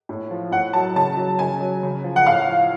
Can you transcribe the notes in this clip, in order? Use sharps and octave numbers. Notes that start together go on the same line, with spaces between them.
A2
F3
A2 F#5
F#3 A5
C#3 A5
F#3
C#3 G#5
F#3
C#3
F3
F#5
A2 F5
F3